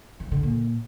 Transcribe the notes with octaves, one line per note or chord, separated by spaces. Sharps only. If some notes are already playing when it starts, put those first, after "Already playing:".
D#3
D3
A#2